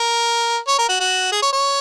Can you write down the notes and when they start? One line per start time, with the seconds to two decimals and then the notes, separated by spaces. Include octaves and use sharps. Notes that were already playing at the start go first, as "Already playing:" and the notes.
Already playing: A#4
0.68 C#5
0.79 A#4
0.89 F#4
1.00 F#4
1.32 G#4
1.42 C#5
1.53 C#5